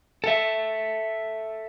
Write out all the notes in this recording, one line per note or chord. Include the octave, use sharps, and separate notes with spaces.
A4 E5